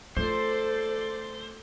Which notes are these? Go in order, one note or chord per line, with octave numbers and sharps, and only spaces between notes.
A3 F4 A4 C5 D5